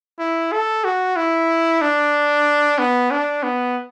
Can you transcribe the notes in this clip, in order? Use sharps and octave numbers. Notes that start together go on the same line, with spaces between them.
E4
A4
F#4
E4
D4
B3
D4
B3